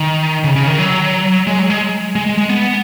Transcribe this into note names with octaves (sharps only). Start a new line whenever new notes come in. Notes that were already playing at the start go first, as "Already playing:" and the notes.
Already playing: D#3
C#3
C#3
D#3
F#3
G#3
F#3
G#3
G#3
G#3
G#3
B3